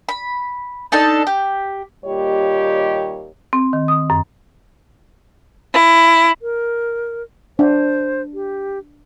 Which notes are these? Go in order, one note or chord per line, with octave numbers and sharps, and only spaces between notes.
B5
D4 D#4 A4 A5
G4
D#2 A#2 G3 G4 C#5 D#5
C4
D#3
D#6
F#2
E4
A#4
D4 C5
G4